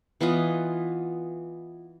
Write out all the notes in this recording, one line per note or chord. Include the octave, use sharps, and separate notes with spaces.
E3 B3 F4 D#5